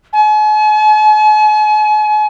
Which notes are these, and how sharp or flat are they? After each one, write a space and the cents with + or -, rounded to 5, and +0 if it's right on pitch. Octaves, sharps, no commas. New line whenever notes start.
G#5 +45